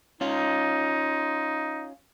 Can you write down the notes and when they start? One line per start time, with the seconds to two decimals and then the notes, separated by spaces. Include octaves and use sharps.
0.21 C#4 D#4 F4